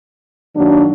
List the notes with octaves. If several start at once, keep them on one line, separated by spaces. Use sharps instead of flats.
F#2 D#3 F#3 A#3 D4